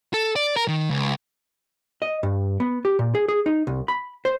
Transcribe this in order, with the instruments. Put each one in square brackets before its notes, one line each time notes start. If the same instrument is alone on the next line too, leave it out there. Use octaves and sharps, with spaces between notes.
[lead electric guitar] A4
D5
A#4
D#3
C#2
[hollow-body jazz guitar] D#5
G2
B3
G4
A#2
G#4
G#4
D#4
C2
B5
C5